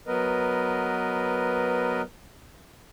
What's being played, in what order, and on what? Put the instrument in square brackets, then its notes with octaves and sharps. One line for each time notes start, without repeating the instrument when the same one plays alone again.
[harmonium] F#3 B3 A#4 B4 D#5